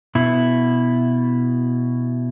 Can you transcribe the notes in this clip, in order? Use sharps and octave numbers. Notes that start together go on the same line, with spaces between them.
B2 E4